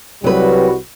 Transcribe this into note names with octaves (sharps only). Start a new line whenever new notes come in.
C2 F#3 G3 F#4 B4